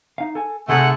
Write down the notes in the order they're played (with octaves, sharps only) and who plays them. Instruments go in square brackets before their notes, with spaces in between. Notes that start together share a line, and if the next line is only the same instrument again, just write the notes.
[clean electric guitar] D#4 F5
A4 G#5
[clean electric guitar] B1 C3 [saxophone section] G#2 A3 [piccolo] F#5